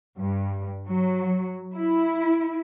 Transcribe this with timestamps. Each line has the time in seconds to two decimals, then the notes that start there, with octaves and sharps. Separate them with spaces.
0.17 G2
0.87 F#3
1.73 E4